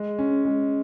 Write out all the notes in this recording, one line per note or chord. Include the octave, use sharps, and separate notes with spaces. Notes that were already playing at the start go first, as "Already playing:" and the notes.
Already playing: G#3
C#4
G#3